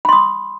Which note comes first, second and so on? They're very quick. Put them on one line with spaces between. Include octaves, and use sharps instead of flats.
B5 C6 D#6